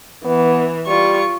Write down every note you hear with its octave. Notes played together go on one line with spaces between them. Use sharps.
E3 B3
G3 F4 C#6